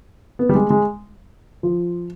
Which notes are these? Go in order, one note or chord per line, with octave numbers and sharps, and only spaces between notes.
B3
G3
G#3
G#3
F3